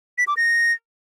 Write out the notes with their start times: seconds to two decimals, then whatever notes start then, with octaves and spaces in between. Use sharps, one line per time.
0.18 B6
0.27 D6
0.37 A#6